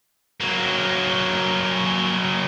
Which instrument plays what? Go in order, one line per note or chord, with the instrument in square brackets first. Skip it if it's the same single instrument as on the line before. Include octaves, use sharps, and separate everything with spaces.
[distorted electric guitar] F#3 A#3